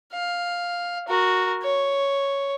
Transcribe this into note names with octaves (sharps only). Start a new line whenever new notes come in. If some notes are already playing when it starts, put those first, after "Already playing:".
F5
F#4 A#4
C#5